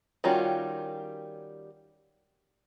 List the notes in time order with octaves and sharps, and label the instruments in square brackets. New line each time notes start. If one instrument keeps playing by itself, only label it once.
[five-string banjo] D#3 G3 C#4 F4 F#4